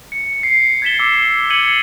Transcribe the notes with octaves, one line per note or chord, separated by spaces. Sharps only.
C#7
C7
G#6 A6 B6 E7 G7
D6 E6
G#6 C#7 D#7 F#7